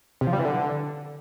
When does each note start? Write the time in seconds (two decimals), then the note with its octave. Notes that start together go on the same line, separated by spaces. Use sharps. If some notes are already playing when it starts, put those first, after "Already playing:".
0.21 C3
0.27 F3
0.33 G3
0.39 E3
0.45 D3